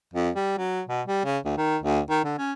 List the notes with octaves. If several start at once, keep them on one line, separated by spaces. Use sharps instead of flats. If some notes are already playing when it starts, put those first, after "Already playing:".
F2
G3
F#3
B2
G3
C#3
D2
D#3
D2
D#3
D3
C#4